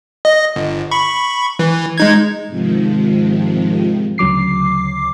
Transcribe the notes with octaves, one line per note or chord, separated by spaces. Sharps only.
D#5
G1
B5 C#6
E3
G#3 D#4 G#6
G#2 C3 D#3 F3
D2 C#3 F#3 D6 C7